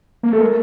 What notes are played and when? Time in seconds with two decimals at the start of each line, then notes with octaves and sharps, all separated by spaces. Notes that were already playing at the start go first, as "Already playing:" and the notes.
0.23 A#3
0.32 A3 A4
0.41 G#3 A#4